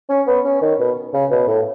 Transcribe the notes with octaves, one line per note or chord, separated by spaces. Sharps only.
C#4
B3
C#4
D#3
B2
C#3
B2
A2